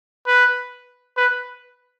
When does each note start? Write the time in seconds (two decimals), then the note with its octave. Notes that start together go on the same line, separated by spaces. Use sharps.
0.27 B4
1.17 B4